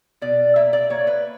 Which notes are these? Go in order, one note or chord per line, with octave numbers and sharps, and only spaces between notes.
B2 D5
A#3 E5
D5
A#3 C#5
B4